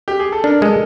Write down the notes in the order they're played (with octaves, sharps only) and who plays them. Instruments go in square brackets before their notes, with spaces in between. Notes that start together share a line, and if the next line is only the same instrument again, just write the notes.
[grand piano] G4
G#4
A4
[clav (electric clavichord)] D4 [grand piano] A#4
[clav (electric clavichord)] G#3 [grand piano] A4